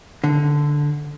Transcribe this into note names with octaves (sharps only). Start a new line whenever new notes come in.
D3